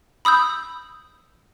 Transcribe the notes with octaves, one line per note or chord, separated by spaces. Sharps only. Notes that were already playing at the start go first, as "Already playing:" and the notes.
B5 D#6 E6 G6